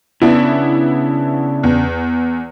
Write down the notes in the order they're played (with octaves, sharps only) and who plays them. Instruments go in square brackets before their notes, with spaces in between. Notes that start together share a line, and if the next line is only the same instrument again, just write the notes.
[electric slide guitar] C#3 D4 [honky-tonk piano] B3 E4
[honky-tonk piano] E2